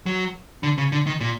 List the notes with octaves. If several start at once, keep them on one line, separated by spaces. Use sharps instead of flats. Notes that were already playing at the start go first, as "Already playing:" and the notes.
F#3
D3
C#3
D3
D#3
A#2